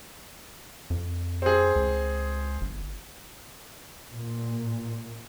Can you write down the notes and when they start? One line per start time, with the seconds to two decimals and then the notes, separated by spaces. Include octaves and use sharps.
0.90 F2
1.42 C4 G#4
1.76 C#2
2.61 G1
4.11 A#2